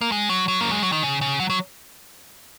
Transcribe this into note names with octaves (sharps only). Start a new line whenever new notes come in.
A#3
G#3
F#3
F#3
A#3
G#3
F#3
D#3
C#3
C#3
F#3
F#3